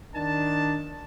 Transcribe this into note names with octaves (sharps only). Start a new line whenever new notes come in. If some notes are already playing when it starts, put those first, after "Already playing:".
D#3 D4 A5